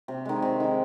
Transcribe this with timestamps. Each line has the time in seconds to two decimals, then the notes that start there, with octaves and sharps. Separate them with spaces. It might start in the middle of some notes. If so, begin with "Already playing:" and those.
0.08 C3 G4
0.25 D#3 G#3
0.42 C3
0.60 D#3 G#3